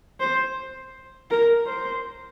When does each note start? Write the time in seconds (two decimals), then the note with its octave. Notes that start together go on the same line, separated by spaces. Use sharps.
0.20 C5
1.30 A#4
1.67 C5